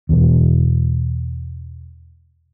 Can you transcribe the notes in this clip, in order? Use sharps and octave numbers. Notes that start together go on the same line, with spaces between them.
E2 B2